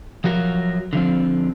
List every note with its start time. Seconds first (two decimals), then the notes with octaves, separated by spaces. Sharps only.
0.24 F3 F#3 F#4 A#4
0.93 D3 F3 C4